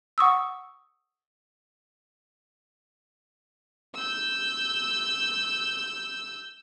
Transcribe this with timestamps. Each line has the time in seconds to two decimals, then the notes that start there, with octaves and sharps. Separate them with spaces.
0.18 F#5 C#6 D#6 E6
3.95 E6 G6